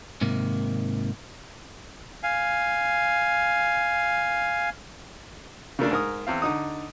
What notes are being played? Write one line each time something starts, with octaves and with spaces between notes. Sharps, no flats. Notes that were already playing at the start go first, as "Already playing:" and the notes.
G#2 C3 D#3 A#3
F5 G#5
C#3 A3 A#3 D4
G#2 A#4 D#6
E2 C4 F5
D3 D#4 D#6